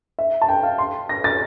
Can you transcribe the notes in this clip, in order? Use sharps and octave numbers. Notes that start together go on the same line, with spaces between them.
E5
A5
G5
F5
C6
A#6
A6